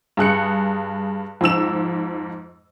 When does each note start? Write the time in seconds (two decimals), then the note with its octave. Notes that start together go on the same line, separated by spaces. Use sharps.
0.17 G2 G#4 F#6 C#7
1.41 F2 G#2 E6 E7